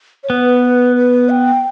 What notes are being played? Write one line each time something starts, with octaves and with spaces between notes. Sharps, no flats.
C#5
B3 B4
B4
G5